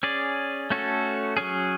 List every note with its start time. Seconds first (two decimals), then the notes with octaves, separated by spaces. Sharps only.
0.03 C#4 G#4 D5
0.70 A3 C#4 F#4 A4
1.37 F#3 C#4 G#4